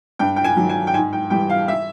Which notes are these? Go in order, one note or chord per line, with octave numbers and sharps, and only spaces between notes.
G2 G5
G5
G#5
D#3 F#3
G#5
G5
G#2 G#5
G5
E3 G3 G5
F5
E5